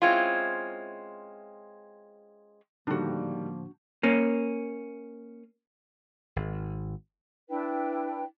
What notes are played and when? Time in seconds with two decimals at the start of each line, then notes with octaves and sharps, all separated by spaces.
0.02 G#3 C4 C#4 E4 F4
2.87 A2 D3 D#3 F3 G3 A#3 D4 F#4
4.03 A#3 C#4
6.36 G#1
7.49 D4 E4 B4 G5